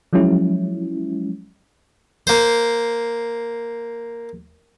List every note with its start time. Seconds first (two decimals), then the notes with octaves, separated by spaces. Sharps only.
0.13 F3 F#3 G#3 C#4 E4
2.27 A#3 C5